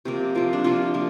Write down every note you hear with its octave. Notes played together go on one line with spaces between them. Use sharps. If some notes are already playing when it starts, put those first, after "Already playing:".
C3 F3 A#3
C3 F3 A#3
D4
C3 F3 A#3 F4
C3 F3 A#3